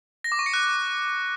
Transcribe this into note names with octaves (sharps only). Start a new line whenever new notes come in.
A#6
D6
C#6
C#7
F#6